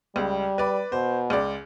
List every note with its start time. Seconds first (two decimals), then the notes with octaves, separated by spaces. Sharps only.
0.16 C#2 G3
0.58 B4 D5
0.92 B2 C5
1.30 C#2 D5